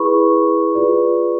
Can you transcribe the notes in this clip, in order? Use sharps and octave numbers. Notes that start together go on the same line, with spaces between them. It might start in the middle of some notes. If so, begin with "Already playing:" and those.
Already playing: E4 G#4 B4 B5 C#6
F4 G#4 B4 D5